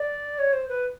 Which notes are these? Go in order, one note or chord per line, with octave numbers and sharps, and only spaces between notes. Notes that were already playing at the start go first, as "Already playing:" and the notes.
Already playing: D5
C#5
C5
B4